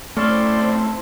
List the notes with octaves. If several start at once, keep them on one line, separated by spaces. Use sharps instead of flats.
A3 C4 C#4 E4 A4 C5 D5 C6